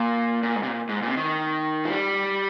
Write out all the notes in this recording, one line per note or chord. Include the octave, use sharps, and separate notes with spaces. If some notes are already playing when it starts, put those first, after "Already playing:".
Already playing: A#2
A#2
G#2
C3
A#2
G#2
A#2
C3
D#3
F3
G3